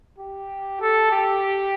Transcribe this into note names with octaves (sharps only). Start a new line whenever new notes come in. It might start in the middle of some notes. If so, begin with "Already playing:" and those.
G4
A4
G4